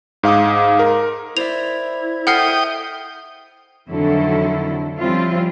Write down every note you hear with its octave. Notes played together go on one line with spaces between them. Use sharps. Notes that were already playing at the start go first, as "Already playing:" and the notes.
G#2 F5 D6 D#6
A#4
E4 C5 D5 E5 F7
A4 D#5 E5 F#5 G5 D#6 F6 C7
F2 D3 D#3 F#3 E4 A4
F3 G3 C4 C#4 E4 F4